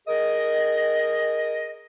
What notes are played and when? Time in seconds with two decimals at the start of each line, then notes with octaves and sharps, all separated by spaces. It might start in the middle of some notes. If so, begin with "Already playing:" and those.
0.08 G#4 A#4 D#5